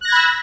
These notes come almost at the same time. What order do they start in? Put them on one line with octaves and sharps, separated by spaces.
F#6 A#6 G#6 B5 E6